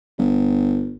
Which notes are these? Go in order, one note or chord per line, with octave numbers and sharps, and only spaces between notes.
G1